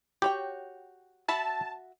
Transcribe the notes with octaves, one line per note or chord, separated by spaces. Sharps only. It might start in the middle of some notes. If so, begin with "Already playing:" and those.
F#4 G4 C#5 G5
F#4 E5 A5 B5